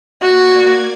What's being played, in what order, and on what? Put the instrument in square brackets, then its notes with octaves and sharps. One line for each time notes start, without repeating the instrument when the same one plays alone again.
[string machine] A#3 D5 G#6 [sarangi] F#4